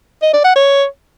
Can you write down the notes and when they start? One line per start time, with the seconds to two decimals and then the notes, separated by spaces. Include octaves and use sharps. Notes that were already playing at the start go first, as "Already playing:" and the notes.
0.22 D#5
0.33 D5
0.44 F#5
0.55 C#5